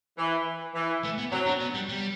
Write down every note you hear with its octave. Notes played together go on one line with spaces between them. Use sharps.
E3
E3
A3
B3
F#3 C4
D4
B3
G3
G3